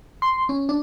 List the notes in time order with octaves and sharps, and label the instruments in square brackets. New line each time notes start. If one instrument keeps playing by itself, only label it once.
[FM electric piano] C6
C#4
D4